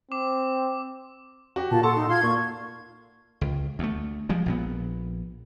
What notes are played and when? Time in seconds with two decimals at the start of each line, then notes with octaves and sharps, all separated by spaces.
0.12 C4 D6
1.56 F#4 G4
1.71 A#2 F4 A5
1.83 A4 F#5 A5 C6 C#6
1.96 D#4
2.09 F4 C6 G#6
2.23 A#2 A#3 C#6
3.41 C#2
3.79 D2 A3
4.29 F3 G3 G#3
4.46 A#1 A#2 B3